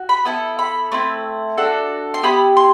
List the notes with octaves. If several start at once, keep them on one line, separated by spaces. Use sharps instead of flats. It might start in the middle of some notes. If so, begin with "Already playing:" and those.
Already playing: F#4
B5
B3 E4 A4
B5
A3 C4 E4
D4 F#4 A4
C6
B3 E4 G4 B5
C6